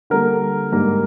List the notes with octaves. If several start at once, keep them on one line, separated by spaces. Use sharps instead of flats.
D3 G3 A#3 A#4
G#2 G3 A#3